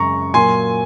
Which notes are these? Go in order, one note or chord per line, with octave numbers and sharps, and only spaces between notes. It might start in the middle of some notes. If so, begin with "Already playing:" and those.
Already playing: F#2 C#3 G#3 A#5 C#6
A#2 F#3 A#3 G#5 C6